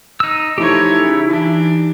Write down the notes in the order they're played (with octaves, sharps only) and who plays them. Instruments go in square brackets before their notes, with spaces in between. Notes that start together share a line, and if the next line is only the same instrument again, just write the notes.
[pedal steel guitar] D#4 E6
[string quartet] F3 A3 C#5 [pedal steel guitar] D#4 G4 [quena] E4
[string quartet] C#3
E3 D4